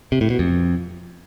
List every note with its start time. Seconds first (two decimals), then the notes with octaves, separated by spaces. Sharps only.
0.12 C3
0.21 A2
0.30 B2
0.39 F2